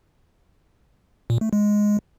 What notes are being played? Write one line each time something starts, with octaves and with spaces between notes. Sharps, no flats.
A#2
A3
G#3